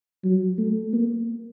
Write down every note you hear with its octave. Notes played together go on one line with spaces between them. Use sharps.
F#3
A3
A#3